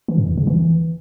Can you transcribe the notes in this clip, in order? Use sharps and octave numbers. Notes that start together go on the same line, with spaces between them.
E3
G#2
E2
C#3
E3